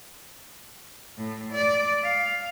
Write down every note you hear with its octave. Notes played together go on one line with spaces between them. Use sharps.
A2
D5
F5